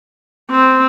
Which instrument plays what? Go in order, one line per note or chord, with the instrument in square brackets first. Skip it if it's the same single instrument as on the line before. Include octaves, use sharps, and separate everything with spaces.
[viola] C4